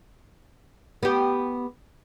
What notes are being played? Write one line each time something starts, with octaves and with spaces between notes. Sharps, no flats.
B3 G4